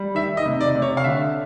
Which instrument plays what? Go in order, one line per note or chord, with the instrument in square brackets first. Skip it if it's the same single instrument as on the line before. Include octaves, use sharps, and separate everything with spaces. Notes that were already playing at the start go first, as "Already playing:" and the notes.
Already playing: [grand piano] G3
D#3 E5
D#5
C3
D5
C3
C#5
F5
D3 E5